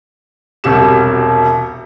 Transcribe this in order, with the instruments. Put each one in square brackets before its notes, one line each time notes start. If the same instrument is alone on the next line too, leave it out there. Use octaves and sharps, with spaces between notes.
[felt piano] E1 C2 F#4 G4 E7